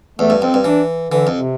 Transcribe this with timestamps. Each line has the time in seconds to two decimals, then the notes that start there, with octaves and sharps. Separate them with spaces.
0.19 E2 A3
0.30 G2
0.42 F2 C4
0.54 G2
0.64 E3 D4
1.11 D3 E3
1.27 F2
1.34 C3